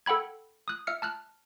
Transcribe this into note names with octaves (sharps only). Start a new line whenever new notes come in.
A4 F#5 G5 B5 G#6
D#6 F#6
E5 F6 C#7
A5 F6 F#6